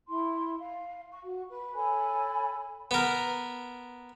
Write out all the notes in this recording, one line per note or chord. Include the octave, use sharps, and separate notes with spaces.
E4 C6
F5
C#6
F#4
B4
A4 C#5 G#5 B5
B3 A#4